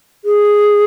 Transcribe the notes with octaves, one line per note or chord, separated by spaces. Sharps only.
G#4